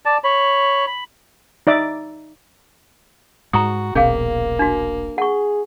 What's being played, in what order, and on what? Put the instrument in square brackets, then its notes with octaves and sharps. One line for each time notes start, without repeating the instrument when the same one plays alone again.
[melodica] D5 A5
C#5 B5
B5
[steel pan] D#4 D5 E5 D6
[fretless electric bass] G#2 G#3 [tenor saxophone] F#4 [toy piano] A#5 C#6 D#6
[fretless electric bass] D#1 A#1 B2 [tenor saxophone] A#3 [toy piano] C#4 G#4 F5
[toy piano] D4 F#4
[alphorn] G#4 [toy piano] F#5 C#6